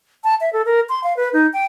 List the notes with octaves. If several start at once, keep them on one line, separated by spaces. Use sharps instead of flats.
A5
E5
A4
A#4
C6
F5
B4
D#4
G5